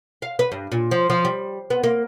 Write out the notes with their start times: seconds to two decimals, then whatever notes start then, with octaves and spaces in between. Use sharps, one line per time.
0.22 F5
0.39 B4
0.52 G2
0.72 A#2
0.91 F3
1.10 F3
1.25 G3
1.70 B3
1.83 A#3